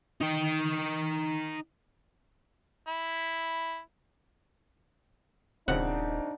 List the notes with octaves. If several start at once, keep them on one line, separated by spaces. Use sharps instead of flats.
D#4 G5
E4
D#1 C#3 F3 C4 D4 D#4 F#5